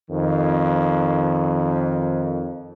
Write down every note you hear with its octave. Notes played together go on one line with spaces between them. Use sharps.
F2 D#3